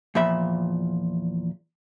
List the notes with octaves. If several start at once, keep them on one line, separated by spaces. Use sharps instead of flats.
E2 A#2 F3 E5 B5